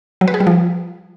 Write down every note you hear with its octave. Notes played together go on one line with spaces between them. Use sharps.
F#3
B4
G#4
G3
F3